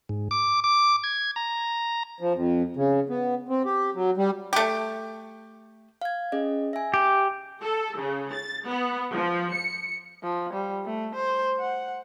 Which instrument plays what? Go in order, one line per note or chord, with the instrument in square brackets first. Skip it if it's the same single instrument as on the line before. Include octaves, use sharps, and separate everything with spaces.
[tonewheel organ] G#2
D6
D6
G#6
A#5
[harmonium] F3
F2
C#3
B3
C4
G4
F#3
G3
[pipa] A3 G4
[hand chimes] F5 G#6
C#4 G#4 D#5
E5 G#5
[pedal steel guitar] G4
[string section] A4
C#3
A6
B3
F3
C#7
[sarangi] F3
G3
A3
C5
F#5